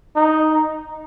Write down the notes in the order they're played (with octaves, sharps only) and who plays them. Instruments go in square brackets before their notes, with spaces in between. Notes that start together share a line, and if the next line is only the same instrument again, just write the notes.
[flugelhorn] D#4